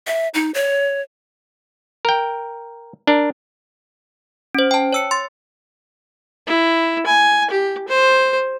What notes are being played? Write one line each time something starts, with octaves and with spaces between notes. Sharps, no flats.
E5
D#4
C#5
A#4 G5
D4 A#4
C#4 C5
G5 A5
C#5 E6 C#7
C6 A6
E4
G#5
G4
C5